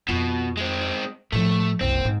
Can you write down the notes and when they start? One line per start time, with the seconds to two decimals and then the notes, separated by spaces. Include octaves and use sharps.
0.08 F2 B2 F4
0.57 G#3 C4
1.32 A2 F3 A3
1.81 F#1 C2 C4
2.05 G#2 G#3